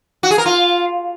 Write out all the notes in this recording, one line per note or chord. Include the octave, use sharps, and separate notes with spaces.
F#4
G#4
A#4
F4